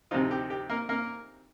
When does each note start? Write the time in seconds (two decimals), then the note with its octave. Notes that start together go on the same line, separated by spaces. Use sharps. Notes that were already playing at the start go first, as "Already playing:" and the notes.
0.11 D2 C3 F3 C4 D#4 F4
0.31 G4
0.50 G4
0.69 A#3 A#4
0.89 A#3 A#4